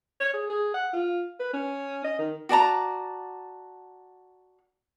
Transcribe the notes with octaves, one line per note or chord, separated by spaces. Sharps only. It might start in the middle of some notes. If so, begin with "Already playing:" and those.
C#5
G#4
G#4
F#5
F4
B4
C#4
D#5
D#3
F#4 D5 A5 A#5